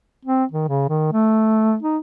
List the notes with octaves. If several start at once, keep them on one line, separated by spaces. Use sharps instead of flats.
C4
D#3
C#3
D#3
A3
D#4